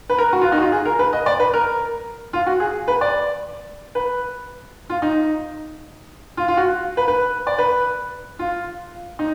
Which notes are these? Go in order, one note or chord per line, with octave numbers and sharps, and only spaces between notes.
B4
A#4
F#4
F4
D#4
F#4
F4
G#4
A#4
B4
D#5
D5
B4
A#4
F4
F#4
G#4
B4
D5
B4
F4
D#4
F4
F4
F#4
B4
B4
D5
B4
F4
D#4